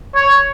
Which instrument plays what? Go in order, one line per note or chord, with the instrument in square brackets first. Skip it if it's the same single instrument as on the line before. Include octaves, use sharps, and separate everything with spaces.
[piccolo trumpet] C#5